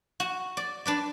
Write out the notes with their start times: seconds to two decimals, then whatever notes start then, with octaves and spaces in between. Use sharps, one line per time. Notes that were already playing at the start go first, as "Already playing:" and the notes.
0.20 F#4
0.57 D5
0.86 D4 B4 D5